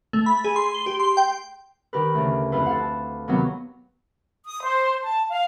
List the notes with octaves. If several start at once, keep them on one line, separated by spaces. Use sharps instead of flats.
A3
B5
G#4
C6
G7
G4
C6
G5
D#3 G4 A#4 B4
D2 C#3
F2 F3 E4 B4 C5
A4 F5 F#5
A5
C3 D#3 F#3 B3
D#6
C5
A5
F5